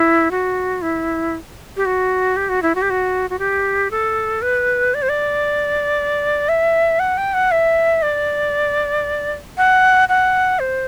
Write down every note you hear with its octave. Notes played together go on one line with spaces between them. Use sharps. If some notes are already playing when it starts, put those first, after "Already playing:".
Already playing: E4
F#4
E4
G4
F#4
G4
F#4
E4
F#4
G4
F#4
F#4
G4
A4
B4
D5
C5
D5
E5
F#5
G5
F#5
E5
D5
F#5
F#5
C5